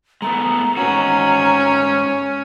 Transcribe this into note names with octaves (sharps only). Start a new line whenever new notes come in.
G#3 A3 B3 A#5
G#2 C#4 F#4